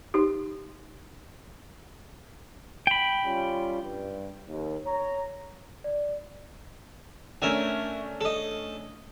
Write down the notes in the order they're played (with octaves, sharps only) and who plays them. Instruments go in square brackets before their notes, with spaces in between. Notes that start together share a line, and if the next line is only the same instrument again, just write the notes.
[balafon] D#4 G4
[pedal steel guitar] G5 B5
[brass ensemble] G3 C#4 F4
G2
D#2
C#5 A#5
[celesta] D5
[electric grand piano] A3 C#4 D4 [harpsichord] A#4 E5 G#5
[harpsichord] A4 D#5